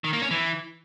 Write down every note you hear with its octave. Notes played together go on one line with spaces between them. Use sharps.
D#3
A#3
C#4
E3